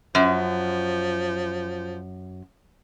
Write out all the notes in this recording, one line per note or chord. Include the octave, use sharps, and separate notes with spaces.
F#2 F3